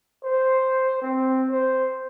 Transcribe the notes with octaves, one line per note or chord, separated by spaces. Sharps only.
C5
C4
C5